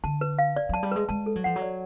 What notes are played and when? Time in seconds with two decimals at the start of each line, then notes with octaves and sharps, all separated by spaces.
0.04 D3 A5
0.21 B4
0.39 F5
0.56 D5
0.69 F#3 A5
0.83 G3
0.92 G#3 B4
1.09 G#3 A5
1.26 A4
1.36 F#3
1.44 F3 F#5
1.56 F#3
1.62 D5